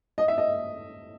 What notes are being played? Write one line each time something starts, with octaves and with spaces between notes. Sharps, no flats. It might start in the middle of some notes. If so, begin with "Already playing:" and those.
D#5
E5
D#5